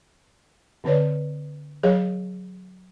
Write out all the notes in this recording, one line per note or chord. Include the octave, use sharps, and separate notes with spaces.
D3 C4 B4 C#5 D5
F#3 G#4 A#4 C#5 F5